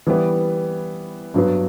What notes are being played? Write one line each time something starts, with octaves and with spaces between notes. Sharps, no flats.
E3 G3 B3
G2 F#3 B3